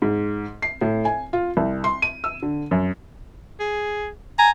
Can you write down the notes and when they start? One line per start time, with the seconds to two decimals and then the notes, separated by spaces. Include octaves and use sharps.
0.02 G#2
0.62 C7
0.81 A2
1.05 G#5
1.33 F4
1.57 C2
1.84 C6
2.02 D#7
2.24 E6
2.42 D3
2.71 F#2
3.60 G#4
4.39 G#5 A#5